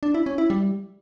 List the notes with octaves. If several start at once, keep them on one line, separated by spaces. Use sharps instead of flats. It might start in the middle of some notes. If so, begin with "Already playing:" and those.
D4
E4
C#4
E4
G3